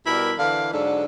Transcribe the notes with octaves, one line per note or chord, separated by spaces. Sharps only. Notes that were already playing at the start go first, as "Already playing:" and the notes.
B2 G3 E4 A#4
D3 E3 D4 F5
G#2 D3 F#3 D4 A4